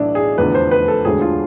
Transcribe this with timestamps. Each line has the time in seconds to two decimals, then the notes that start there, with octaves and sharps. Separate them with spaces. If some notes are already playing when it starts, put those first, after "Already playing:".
Already playing: B1 A2 E3 D4 E4
0.15 G#4
0.38 F1 E2 D3 B4
0.55 C5
0.71 B4
0.88 A4
1.04 E1 D2 D3 G#4
1.21 F4